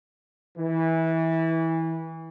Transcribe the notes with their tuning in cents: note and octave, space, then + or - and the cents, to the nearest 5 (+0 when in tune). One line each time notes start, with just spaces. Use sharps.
E3 -20